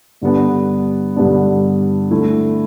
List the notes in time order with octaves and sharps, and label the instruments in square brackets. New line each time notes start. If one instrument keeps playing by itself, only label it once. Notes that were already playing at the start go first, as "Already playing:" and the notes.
[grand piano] G2 D3 G3 B3 D4
G2 D3 G3 B3 D4
D3 A3 E4